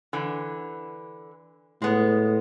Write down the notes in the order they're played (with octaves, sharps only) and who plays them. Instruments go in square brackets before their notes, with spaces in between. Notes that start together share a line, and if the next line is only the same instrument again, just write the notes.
[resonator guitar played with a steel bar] D3 E3
[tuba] A2 [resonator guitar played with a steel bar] G#3 B3